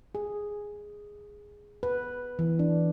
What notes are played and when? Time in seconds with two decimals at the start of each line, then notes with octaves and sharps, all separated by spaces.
0.15 G#4
1.83 B4
2.39 E3
2.59 D4